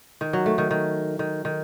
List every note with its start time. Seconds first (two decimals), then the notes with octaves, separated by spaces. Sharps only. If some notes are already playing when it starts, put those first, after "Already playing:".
0.21 D#3
0.33 F#3
0.46 A3
0.58 D#3
0.71 D#3
1.19 D#3
1.45 D#3